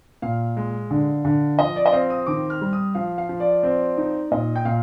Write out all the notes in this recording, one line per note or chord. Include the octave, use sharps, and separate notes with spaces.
A#2 F5
G#3
D3
D3
F3 D#5
D5
D#5
C4 F5
D#6
D#3 D6
F6
G3
D#6
F3 F5
F5
F3
D5
C4
D#4
A#2 D#5
G5
A#2 F5